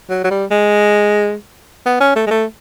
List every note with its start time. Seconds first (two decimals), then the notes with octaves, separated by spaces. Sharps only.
0.10 F#3
0.24 F#3
0.31 G3
0.51 G#3
1.86 B3
2.00 C#4
2.16 A3
2.27 G#3
2.31 A3